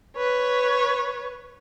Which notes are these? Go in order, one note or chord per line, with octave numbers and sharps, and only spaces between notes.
B4 C#5